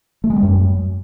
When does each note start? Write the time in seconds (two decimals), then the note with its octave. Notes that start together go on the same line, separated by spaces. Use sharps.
0.24 A3
0.30 G#3
0.36 G3
0.43 F#2